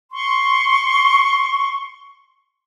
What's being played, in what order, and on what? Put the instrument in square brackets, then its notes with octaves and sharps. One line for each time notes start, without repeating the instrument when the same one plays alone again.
[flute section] C6 C#6